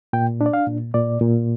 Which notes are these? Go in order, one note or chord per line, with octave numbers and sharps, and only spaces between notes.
A#2 G5
D4
D5
F5
A#2
A#2 D5
A#2